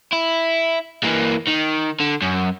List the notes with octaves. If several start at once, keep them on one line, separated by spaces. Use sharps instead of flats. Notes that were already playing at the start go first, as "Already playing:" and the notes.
E4
E3 A#3
D#3
D3
F#2